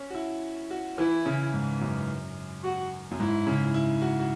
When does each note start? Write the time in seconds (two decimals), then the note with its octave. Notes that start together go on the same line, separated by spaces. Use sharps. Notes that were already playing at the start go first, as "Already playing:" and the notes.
Already playing: C#4
0.10 F#4
0.15 E4
0.71 F#4
0.98 E3 E4
1.26 C#3
1.53 G#2
1.81 F#2
2.63 F#4
3.11 F#2
3.19 G#2 E4
3.47 C#3
3.74 E4
4.02 F#4
4.20 F#4